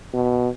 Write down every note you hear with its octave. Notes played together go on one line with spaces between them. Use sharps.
B2